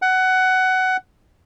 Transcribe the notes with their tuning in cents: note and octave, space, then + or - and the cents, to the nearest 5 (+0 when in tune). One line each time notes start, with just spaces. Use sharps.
F#5 +15